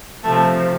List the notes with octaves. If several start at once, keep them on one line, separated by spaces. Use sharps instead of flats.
C3 F3 A3